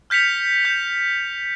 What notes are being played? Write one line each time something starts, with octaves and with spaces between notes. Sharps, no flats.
F6 G6 B6 C#7 F7
G6